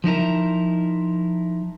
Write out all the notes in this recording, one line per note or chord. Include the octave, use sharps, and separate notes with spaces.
F3 D#4 E4 A#4